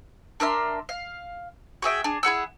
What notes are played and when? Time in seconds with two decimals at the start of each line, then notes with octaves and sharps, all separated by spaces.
0.40 D4 A#4 E5 C6
0.89 F5
1.82 F#4 G#4 E5 G5
2.04 D4 G#4
2.23 E4 G#4 F#5 E6